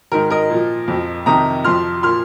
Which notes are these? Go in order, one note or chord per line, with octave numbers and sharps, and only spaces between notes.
G#2 D#3 A#4
A#4 D#5
A#2 F3
F2 F3
F2 C3 D#3 A#5 D#6
F2 F3 C6 F6
A#2 F3 C6 F6